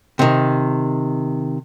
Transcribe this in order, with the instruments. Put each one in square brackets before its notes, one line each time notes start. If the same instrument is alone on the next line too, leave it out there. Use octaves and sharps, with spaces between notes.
[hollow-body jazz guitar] C3 D#3